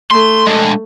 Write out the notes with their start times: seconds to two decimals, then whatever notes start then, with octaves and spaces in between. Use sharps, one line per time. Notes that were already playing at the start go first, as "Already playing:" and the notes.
0.11 A3 C6
0.47 G#3 D4